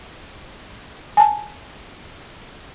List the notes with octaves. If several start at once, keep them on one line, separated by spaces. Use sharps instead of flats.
G#5 A5